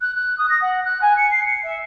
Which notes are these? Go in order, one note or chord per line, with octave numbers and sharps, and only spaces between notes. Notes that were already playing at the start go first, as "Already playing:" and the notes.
F#6
F#6
D#6
A#6
F#5
F#6
G#5
C#7
C7
C#7
E5